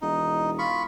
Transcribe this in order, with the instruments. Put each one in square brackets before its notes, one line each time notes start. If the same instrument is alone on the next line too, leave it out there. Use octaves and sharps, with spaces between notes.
[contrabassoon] E1 [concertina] D#4
[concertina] F4 B5 C#6